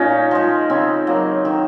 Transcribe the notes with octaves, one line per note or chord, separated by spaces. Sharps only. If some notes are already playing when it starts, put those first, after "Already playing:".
Already playing: A#2 C#4 D#4
F3 G#3
C#3 C4
F#3 A#3
D#3